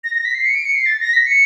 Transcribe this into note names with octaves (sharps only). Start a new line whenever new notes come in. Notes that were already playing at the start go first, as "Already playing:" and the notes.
A#6
A#6
B6
C7
C#7
D7
C#7
C7
A6
A#6
B6
C#7